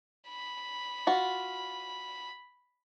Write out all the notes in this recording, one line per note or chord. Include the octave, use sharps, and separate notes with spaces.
B5
F4 F#4